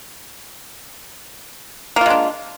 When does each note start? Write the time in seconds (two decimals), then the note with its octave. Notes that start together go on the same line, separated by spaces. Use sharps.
1.96 A#3
2.01 F4
2.06 G#3
2.10 D4